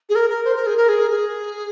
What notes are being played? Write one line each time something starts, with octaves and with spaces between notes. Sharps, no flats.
G#4
A#4
A#4
C5
A#4
G#4
A#4
G#4
G#4